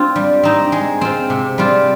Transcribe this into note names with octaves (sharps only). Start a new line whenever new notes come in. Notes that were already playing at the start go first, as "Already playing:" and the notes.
Already playing: C4 D4 F4
G3
C4 D#4
G#3
C4 F4
C3
G3 C4 F4